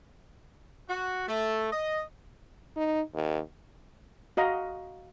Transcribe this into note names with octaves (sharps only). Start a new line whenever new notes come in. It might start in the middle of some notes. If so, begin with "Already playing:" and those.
F#4
A3
D#5
D#4
D#2
F#4 D#5 F5 A#5